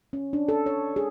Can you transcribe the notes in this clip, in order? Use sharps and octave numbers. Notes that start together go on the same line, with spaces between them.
C#4
D4
A4
C#5
G#4